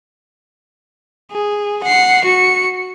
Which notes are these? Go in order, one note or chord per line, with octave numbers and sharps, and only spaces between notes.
G#4
F#5 C7
F#4 C#7